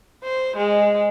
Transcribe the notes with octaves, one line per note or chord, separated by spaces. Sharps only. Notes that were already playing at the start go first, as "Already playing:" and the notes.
C5
G#3